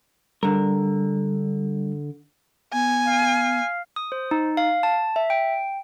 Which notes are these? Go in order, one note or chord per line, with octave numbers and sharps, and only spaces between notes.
D3 G3 A#4
B3 G#5
F5
D#6
C5
D#4
F5
A5
E5
G5